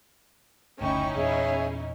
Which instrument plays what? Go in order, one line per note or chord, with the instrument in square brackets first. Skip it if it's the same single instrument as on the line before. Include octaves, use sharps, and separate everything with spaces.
[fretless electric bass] F#1 D2 A2 [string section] C#4 D#4 E4 [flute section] G5 C#6
[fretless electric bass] E2 A#2 [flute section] G#4 C#5 E5